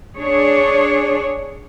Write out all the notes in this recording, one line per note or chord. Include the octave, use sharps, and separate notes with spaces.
D4 G#4 C#5